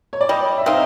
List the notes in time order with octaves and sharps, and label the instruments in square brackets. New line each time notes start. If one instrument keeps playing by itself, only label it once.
[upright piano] C#5
D5
[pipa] G3 [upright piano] D#5
[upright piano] E5
[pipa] C4 D#4 [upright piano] F5